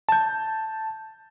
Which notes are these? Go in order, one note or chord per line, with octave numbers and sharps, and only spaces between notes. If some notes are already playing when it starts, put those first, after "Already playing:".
A5 G6